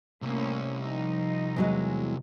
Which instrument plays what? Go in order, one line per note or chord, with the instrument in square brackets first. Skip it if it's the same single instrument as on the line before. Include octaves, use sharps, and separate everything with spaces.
[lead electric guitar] C2 [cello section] A2 A#3 C#4
[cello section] F3 D#4
[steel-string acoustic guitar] E2 F#3 G#3